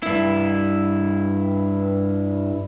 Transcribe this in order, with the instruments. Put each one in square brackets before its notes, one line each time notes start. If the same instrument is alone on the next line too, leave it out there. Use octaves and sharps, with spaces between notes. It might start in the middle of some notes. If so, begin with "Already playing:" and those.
[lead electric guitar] G2 E4